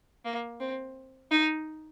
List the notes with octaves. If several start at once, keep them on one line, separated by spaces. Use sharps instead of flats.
A#3
C4
D#4